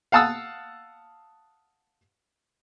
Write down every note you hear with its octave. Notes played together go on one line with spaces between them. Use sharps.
F5 F#5 A5 D#6 E6